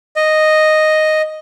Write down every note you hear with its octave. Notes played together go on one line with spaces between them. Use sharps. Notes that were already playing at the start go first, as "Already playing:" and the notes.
D#5